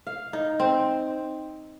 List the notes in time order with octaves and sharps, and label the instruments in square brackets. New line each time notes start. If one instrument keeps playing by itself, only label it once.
[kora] F5
D#4
C4